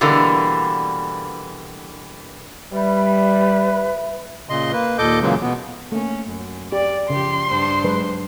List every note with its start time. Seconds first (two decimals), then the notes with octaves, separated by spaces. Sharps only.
0.01 B2 D3 E3 G3 A#3
2.72 G3 B4 E5
4.49 A#2 C#3 D#5 C6
4.72 A#3 B4
4.98 D#2 A#2 A4 D#5 D6 G6
5.21 A#2 C#3 E3 F#3 G#3 A#3
5.41 B2 B3
5.92 A3 A#3 C#4
6.27 F#2
6.72 G4 D5
7.10 C#3 F3 G4 C6
7.48 G2 D4 C5
7.84 F#3 G#3 B4